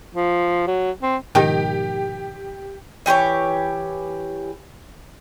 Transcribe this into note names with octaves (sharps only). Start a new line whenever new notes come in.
F3
F#3
C4
G#2 B2 D#3 F3 D#4 G4 G5
E3 G4 B4 C#5